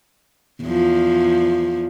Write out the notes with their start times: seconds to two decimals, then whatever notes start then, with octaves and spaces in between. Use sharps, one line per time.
0.63 E2 F3